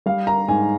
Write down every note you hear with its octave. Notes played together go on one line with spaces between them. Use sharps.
G3 F5
A#5
G#2 G#5